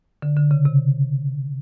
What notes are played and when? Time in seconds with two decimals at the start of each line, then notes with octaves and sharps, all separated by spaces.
0.22 D3
0.36 D3
0.51 C#3
0.65 C3